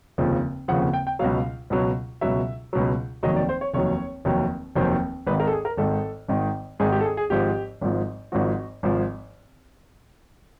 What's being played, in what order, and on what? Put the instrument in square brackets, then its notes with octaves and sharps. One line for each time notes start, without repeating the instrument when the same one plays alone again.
[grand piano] F1 D#2 C#3 F3
F1 D#2 C#3 F3 F#5
F#5
G5
G5
C#2 B2 F#3 F5
C#2 B2 F#3
C#2 B2 F#3 E5
C#2 B2 F#3
F1 D#2 D#3 F#3 D#5
D5
C5
C#5
F1 D#2 D#3 F#3 C#5
F1 D#2 D#3 F#3
F1 D#2 D#3 F#3 C5
G#1 G#2 D#3 B4
A#4
A4
G#4
A#4
G#1 G#2 D#3 A4
G#1 G#2 D#3
G#1 G#2 D#3 G#4
G4
A4
G#4
G#4
G#1 G#2 F3 G4
G#1 G#2 F3
G#1 G#2 F3 F#4
G#1 G#2 F3